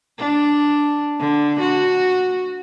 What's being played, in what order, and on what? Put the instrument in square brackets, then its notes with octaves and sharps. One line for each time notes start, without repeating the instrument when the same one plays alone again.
[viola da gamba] D4
D3
F#4